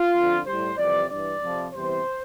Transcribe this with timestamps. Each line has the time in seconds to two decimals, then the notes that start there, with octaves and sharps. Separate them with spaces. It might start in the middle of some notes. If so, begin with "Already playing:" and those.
Already playing: F4
0.14 F2 D3 F3
0.46 A2 G3 C5
0.78 F2 C3 E3 G3 D5
1.10 G2 E3 G3 D5
1.42 F2 C3 F3
1.74 E2 C3 E3 G3 C5